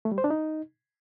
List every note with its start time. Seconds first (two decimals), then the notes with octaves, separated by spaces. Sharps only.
0.05 A3
0.12 G3
0.18 C5
0.24 D4
0.30 D#4